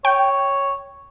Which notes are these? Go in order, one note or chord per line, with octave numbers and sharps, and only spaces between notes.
C#5 G5